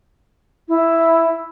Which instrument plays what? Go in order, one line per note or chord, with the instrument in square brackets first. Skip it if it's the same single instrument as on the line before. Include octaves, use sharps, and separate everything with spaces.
[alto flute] E4